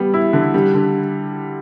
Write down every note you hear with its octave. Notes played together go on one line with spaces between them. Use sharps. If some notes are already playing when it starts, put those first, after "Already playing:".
Already playing: G3 B3
E4
D3
G3
D3